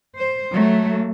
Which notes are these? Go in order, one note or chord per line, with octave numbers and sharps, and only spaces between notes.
C5
F#3 A3